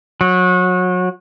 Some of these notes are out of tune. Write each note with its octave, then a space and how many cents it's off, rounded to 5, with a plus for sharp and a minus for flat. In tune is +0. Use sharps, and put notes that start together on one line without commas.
F#3 -30